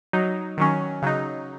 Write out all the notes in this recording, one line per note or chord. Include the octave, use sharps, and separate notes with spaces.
F#3 D#4
D#3 F#3 C#4
C#3 F#3 D#4